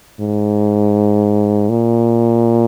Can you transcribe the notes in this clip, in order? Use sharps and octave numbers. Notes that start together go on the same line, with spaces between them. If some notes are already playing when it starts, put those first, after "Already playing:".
G#2
A#2